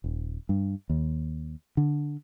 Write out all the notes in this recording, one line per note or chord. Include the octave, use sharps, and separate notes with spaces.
D#1
G2
D#2
D3